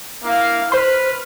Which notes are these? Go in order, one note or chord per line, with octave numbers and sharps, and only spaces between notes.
A#3 E4 F5
B4 C5 C6 F6